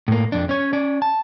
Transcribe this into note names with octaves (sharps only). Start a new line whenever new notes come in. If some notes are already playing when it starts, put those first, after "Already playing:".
A2 A#3
F2 D4
C#4 C#5
C#4 D5
A5